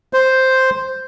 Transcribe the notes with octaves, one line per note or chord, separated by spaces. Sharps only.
C5